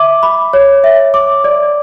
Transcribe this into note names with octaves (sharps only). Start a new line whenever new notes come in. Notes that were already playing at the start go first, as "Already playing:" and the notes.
Already playing: E5 D6
B5
C#5
E5
D6
D5